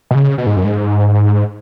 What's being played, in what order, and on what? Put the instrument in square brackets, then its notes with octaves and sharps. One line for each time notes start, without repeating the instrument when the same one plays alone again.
[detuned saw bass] B2
C#3
B2
G#2
F#2
G#2